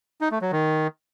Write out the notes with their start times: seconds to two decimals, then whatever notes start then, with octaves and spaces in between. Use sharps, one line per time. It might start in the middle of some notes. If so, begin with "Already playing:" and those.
0.21 D#4
0.31 A3
0.42 F#3
0.52 D#3